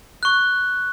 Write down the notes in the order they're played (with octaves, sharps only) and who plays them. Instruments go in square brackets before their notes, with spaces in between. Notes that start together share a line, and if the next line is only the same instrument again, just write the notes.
[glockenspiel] C#6 F#6